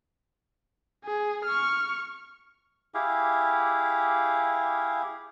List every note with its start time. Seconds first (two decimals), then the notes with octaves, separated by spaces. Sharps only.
1.04 G#4
1.45 C#6 F6
2.94 E4 G4 G#4 F5